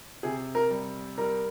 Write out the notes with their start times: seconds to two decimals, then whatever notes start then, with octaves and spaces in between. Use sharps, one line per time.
0.23 C3 G#4
0.55 A#4
0.70 G3
1.18 G3 A#4